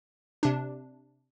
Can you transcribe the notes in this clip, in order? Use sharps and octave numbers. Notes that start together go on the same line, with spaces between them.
C3 D4